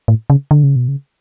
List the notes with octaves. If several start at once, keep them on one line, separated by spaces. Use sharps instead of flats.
A2
C#3
D3
C#3
B2
C#3